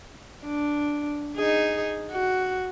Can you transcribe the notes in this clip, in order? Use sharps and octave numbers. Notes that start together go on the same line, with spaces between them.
D4
D#4 G#4
F#4